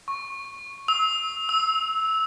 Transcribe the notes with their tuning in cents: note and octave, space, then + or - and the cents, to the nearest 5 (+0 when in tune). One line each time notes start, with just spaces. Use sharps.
C#6 -10
E6 -35
E6 -15